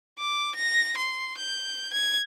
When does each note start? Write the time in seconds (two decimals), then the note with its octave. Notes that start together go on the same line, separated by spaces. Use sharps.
0.19 D6
0.55 A#6
0.97 C6
1.37 G6
1.93 G#6